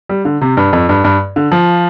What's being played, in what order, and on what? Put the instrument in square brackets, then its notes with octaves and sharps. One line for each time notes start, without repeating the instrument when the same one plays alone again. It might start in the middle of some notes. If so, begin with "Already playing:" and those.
[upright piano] G3
D3
C3
G2
F2
G2
G2
D3
F3